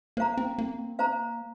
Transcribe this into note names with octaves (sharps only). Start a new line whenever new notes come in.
A#3 C5 F5 A#5
C4
A#3
C4
A#3 C5 F5 A#5